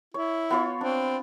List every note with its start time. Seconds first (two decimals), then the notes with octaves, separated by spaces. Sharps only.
0.14 E4 C#5
0.50 B3 F4 C#5
0.81 C4 D4